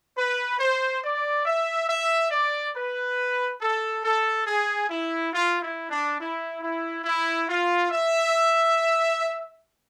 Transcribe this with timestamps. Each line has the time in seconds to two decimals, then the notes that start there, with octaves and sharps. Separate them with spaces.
0.17 B4
0.60 C5
1.03 D5
1.45 E5
1.89 E5
2.31 D5
2.75 B4
3.60 A4
4.03 A4
4.47 G#4
4.89 E4
5.33 F4
5.61 E4
5.90 D4
6.19 E4
6.61 E4
7.04 E4
7.47 F4
7.90 E5